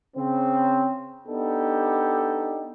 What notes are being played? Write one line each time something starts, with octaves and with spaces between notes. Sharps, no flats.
C#3 C4
B3 D4 D#4 G4 A4